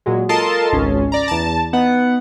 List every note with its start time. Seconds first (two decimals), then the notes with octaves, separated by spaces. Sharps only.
0.06 A#2 F#3 G#3
0.29 F4 A4 A#4 D#5 A5 C6
0.73 G#1 C#2 C#4
1.12 D5 A#5
1.28 E2 A5
1.73 B3 D#4 F#5